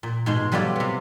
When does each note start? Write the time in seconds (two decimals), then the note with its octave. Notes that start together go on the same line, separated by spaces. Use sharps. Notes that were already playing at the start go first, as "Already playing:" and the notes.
0.03 A#2
0.26 G#2 B2 G#3 C6
0.52 F#3 G3 B3 F4 A4 D5
0.76 C3 B3